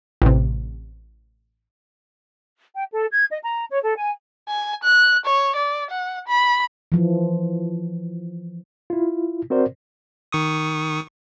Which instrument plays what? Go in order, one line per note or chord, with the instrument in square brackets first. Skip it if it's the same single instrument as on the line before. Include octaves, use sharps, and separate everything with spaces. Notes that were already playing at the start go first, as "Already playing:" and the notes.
[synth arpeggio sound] A1 C3
[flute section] G5
A4
G#6
D#5
A#5
C#5
A4
G#5
[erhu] G#5
F#6
C#5
D5
F#5
B5
[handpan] E3 F3
[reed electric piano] E4 F4
C4 F#4 A#4 C5 D5
[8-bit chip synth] D#3 C#6 D#6